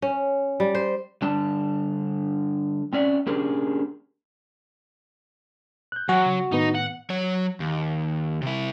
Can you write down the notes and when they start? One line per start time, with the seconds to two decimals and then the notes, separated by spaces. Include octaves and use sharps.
0.02 C#4
0.60 G3
0.75 C5
1.22 D3 G3 D4 A5
2.93 C4 C#4 D5 E5 F#5
3.27 A#3 C#4 D4 G4 G#4 A#4
5.92 F#6 G6
6.09 F#3 F#4 G#5 F#6
6.26 C#3
6.52 A2 D#3 B3 D#4
6.75 F#5
7.10 F#3 C#5
7.60 D#2
8.42 C3 E4